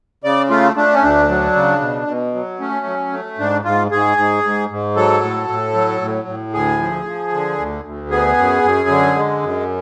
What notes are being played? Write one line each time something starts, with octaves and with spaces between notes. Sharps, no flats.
C#3 D5
A3 F4
A3 D4
C#4
D2 D4
F#3
C#3
B2
B2
F#3
A3 C#4
F#3
A3
G#2 D4
G#2 F4
G#2 G#4
G#2
G#2
G#2
F#3 A4
A2
A2
F#3
A2
A2
D2 G#4
F3
F3
D3
D2
D2
B3 G#4
F#2
F#2
D3
G#3
F#2